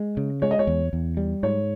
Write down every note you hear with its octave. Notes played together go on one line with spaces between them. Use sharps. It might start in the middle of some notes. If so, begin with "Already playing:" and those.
Already playing: G#3
C#3
G#3 C#5
D#5
C#5
E2
E2
G3
G#2 C#5